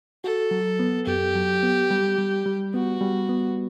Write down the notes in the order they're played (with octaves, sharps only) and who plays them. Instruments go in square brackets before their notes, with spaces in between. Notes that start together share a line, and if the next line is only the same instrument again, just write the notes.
[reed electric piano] F#4 [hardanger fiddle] A4
[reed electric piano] F#3
B3
[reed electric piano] F#2 [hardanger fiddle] G4
[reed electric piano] F#3
B3
G3
G3
G3
[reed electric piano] B3 [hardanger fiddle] F#4
[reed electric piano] G3
B3